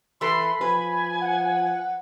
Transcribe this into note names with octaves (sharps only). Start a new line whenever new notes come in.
E3 A4 B4 B5 C6
F3 B4 G#5
F#5